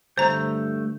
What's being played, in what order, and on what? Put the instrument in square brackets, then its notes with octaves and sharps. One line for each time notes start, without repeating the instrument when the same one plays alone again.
[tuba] G2 [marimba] D3 [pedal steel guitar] A3 G6 [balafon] C5 A#5